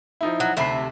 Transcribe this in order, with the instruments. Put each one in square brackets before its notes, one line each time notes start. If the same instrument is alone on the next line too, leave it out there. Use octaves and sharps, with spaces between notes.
[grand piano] F3 D#4 E4
[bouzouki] F#3
[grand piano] D2 B5 C7 [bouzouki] C3 A3 E5